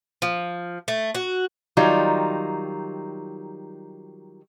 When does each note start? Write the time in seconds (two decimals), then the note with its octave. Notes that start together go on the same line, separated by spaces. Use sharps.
0.22 F3
0.88 A3
1.15 F#4
1.77 D#3 F#3 G3 D#4 F4